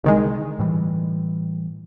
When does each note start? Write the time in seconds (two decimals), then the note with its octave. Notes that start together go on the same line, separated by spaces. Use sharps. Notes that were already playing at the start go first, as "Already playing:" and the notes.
0.04 C2 D3 D#3 G#3
0.59 A2 E3 G3